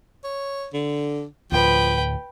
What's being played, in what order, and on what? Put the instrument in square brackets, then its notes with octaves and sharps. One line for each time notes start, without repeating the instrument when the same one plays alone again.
[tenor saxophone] C#5
D3
[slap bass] D2 A2 [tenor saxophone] F3 [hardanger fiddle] B4 G5